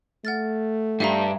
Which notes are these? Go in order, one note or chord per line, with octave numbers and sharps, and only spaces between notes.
A3 F#5 F6 A6
G2 E5 F5 A#5